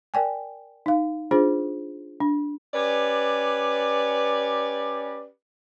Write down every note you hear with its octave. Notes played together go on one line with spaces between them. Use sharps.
A#4 D5 G5 G#5
D#4 F5
D4 F4 G#4 C5
D4
C#4 G4 B4 D5